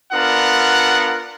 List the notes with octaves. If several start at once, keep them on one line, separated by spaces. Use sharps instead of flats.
B3 D4 F4 A#4 F#5